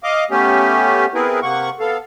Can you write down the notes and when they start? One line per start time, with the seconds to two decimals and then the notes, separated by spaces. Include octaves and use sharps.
0.03 D#5 F5 D6
0.31 A3 B3 C#4 G4
1.15 B3 C4 E4 G#4 A#4 B4
1.42 C3 A#3 F#5 C#6
1.80 B3 A4 F5